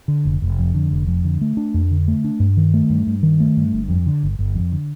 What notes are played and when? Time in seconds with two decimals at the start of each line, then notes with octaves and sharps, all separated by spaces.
0.08 D3
0.25 F1
0.42 F1
0.59 F2
0.75 D3
0.91 F1
1.07 F2
1.25 D3
1.41 A3
1.57 D4
1.74 F2
1.91 D3
2.08 A3
2.24 D4
2.40 G2
2.57 D#3
2.74 A3
2.90 G2
3.07 G2
3.23 D#3
3.40 A3
3.57 G2
3.73 G1
3.89 F2
4.06 D3
4.23 G1
4.39 G1
4.55 F2
4.72 D3